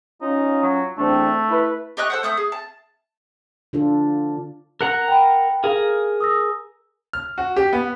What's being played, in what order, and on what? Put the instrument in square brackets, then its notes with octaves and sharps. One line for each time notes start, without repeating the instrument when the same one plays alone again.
[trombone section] C#4 F4 [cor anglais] D#4
[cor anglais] F#3
[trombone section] E2 C4 D4 [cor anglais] A3
[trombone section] E4 B4
[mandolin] G4 D#5 C#6 F#6
A4 C5 F#5
A3 D#6 F#6 G6
G#4
A5
[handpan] D3 D4 F4 A4
[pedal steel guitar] A#4 F#5 A#5 [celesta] F#6
[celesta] G5 B5
[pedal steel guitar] G#4 A#4 [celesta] F5
[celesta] D#6 E6 A#6
[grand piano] F6
F#4
G4
B3